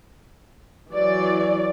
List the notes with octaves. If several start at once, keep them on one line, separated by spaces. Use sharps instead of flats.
E3 F#3 D5